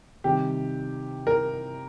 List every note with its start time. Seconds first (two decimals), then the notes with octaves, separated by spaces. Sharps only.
0.24 C3 D#3 G3 G4
1.27 A#4